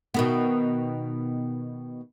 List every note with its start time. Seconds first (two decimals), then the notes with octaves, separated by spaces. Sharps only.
0.14 B2 D#3 B3